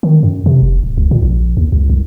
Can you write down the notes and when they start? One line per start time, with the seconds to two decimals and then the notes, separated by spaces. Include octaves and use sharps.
0.03 D#3
0.23 F#2
0.46 C3
0.62 F1
0.83 D1
0.97 C#2
1.11 A#2
1.23 A#1
1.57 D#2
1.72 C#2
1.90 C2